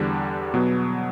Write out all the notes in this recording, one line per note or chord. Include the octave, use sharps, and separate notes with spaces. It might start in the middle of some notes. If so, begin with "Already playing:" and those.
Already playing: E2 D3 G3 D4
B2 F#3 B3